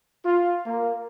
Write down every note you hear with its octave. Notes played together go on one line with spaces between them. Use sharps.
F4
A#3